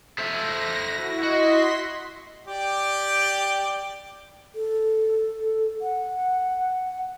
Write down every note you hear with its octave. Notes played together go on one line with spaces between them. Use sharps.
A4 C5 E5 A#6
E4 F#4
F#4 D#5 C6 B6
G4 D5 G5
A4
F#5